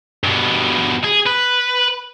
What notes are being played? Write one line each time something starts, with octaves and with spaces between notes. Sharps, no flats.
G2 B2
G#4
B4